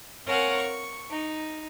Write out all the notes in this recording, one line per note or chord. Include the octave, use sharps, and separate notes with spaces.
C4 A#4 C#5 F5 F#5 G#5
C#6
D#4